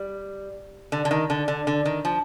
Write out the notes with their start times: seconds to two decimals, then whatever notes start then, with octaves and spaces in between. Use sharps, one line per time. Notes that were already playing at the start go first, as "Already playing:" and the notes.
Already playing: G3
0.92 D3
1.05 D3
1.11 D#3
1.30 D3
1.48 D3
1.67 D3
1.85 D#3
2.05 F3